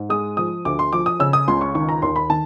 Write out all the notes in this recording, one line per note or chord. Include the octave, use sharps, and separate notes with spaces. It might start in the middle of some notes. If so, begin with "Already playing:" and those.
Already playing: G#2
G#3 D#6
F3 D#6
D2 D6
C6
F3 D6
D#6
C#3 E6
D#6
C#2 C6
C#6
D#3 C#6
A#5
D#2 C6
B5
D#3 A5